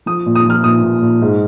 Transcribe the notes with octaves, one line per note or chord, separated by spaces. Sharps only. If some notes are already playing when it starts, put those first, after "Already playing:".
F3 D#6
A#2
D#6
F3 F6
A#2 D#6
A#2
A#2
G#2